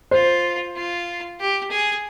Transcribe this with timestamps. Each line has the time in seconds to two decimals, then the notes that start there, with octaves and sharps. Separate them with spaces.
0.11 F4 C5
0.76 F4
1.40 G4
1.71 G#4